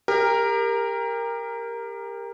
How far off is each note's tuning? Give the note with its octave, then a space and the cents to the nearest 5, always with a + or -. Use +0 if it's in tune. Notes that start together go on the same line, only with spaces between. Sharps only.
G4 +35 A#4 +0